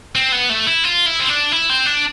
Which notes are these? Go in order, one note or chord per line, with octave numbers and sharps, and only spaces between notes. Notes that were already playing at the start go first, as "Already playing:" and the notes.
C4
B3
A3
E4
F4
E4
C4
D4
E4
C4
D4